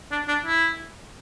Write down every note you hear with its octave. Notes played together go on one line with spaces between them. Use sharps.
D4
D4
E4